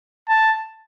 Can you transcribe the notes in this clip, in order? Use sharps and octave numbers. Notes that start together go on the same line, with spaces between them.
A5